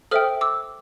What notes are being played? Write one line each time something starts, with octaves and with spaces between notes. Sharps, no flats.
A4 C5 E5 G5 D#6 F6
D6 E6